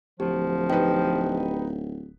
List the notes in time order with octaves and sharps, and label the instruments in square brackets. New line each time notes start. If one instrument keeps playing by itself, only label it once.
[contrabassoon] D1 [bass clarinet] F3 [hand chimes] G4
[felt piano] D#4 B4 [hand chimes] G4 G5